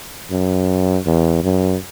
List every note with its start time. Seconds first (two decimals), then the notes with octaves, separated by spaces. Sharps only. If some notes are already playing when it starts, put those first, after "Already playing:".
0.31 F#2
1.06 E2
1.43 F#2